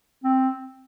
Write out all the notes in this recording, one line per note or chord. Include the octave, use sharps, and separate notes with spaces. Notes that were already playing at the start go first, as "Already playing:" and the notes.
C4